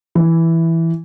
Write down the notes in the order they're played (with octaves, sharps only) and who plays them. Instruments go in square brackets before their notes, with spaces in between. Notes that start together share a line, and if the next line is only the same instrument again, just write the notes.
[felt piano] E3